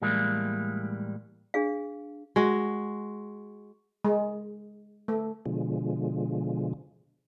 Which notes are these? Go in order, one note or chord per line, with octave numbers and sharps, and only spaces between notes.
A2 E3 G3 G#3 A#3
D4 G#4 F5
G#3 F#4
G#3
A3
B2 D3 F3 G#3